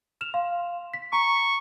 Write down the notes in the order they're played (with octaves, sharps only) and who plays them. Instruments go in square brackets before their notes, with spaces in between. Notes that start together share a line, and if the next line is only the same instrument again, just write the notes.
[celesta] F6 E7 F7
F5 C6
B6
[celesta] A#5 [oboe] C#6